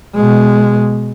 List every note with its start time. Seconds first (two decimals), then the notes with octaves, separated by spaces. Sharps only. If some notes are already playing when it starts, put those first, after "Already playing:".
0.15 B2 G#3